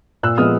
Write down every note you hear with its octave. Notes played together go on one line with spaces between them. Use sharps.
A#2 E6 F#6
F3 G#3 B3 D#6 F6